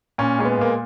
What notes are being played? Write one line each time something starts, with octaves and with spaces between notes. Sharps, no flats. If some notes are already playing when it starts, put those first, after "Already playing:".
A#2 C#4
G#3 C#4
B3
A#2 A#3